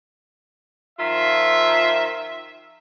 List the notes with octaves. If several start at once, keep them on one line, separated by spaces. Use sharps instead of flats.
D#3 F3 F4 E5